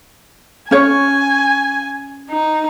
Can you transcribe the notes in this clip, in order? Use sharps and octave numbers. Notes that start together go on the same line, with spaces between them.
C#4 C#5 G#5
D#4